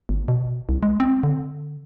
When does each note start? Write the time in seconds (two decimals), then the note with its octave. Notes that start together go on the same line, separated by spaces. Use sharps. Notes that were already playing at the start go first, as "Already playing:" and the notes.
0.09 G1
0.28 B2
0.69 C2
0.83 G#3
1.00 C4
1.23 D3